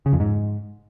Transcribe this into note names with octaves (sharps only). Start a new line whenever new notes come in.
C#3
F2
G#2